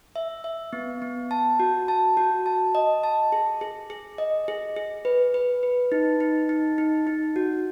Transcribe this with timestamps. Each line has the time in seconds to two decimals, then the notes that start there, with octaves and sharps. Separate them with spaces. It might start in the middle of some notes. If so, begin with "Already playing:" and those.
0.16 E5
0.44 E5
0.73 B3
1.02 B3
1.31 A5
1.60 F#4
1.88 A5
2.17 F#4
2.46 A5
2.75 D#5
3.03 A5
3.32 G#4
3.61 G#4
3.90 G#4
4.18 D#5
4.48 G#4
4.76 G#4
5.05 B4
5.34 B4
5.63 B4
5.92 D#4
6.20 D#4
6.49 D#4
6.78 D#4
7.07 D#4
7.36 F#4